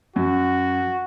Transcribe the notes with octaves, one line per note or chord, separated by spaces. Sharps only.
F#2 F#4